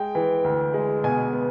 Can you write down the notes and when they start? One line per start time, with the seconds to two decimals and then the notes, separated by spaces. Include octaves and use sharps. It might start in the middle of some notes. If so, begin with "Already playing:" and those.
Already playing: G#3 G5
0.15 E3
0.44 D2
0.74 G#3
1.04 B2 G#5
1.33 B3